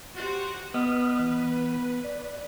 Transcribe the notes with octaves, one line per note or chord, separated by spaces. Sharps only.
F#4 G4 C5
B3 B4 D#5 D#6 F6
E3
D5